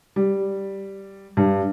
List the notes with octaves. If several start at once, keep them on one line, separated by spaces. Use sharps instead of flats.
G3
G2